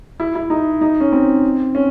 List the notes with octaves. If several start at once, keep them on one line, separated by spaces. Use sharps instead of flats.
E4
E4
D#4
D#4
C#4
C4
C#4